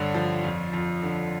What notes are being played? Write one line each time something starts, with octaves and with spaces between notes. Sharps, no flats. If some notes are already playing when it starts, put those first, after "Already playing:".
Already playing: G2 D3 C#5
F3
F2
F2
D3